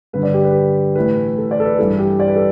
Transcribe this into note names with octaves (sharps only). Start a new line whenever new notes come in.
G2 D3 B4
D5
G4
B4
A2 E3 B4
A4
D5
A4
B4
G2 E3 A4
G4
D5
B4
A4